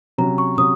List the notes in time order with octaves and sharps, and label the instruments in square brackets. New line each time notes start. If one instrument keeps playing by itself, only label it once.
[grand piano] C3 F#3 C#4 [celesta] A#5
[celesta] C#6
[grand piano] C3 F#3 C#4 [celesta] D#6